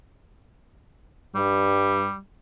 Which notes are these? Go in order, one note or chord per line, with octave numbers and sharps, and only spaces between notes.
G2 G3